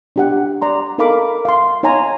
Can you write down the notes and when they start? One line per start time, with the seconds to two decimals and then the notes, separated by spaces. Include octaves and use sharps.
0.16 D4 G4 F#5
0.62 D5 A#5 C6
0.98 D#4 A4 A#4 F5 B5 D6
1.45 F5 C6
1.83 D#4 C#5 F5 G#5 A#5 C6